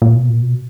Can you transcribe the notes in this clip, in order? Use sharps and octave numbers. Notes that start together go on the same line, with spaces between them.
A#2
B2
A#2
B2